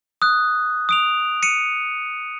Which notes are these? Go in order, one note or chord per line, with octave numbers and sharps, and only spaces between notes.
D#6 F#6
D#6 D7 F7
C#7 D#7